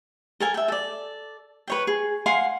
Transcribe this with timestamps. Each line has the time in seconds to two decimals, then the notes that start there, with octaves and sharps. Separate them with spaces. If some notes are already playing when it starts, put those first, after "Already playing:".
0.40 A4 A#4 G#5
0.54 E5 G5
0.68 A4 D5
1.68 B4 C#5 G5
1.87 G#4
2.26 F5 F#5 G#5 C6